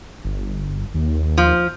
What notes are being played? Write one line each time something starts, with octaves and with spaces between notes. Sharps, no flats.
G1
D#2
F3